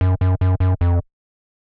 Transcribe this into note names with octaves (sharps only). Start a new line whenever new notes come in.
F#2
F#2
F#2
F#2
F2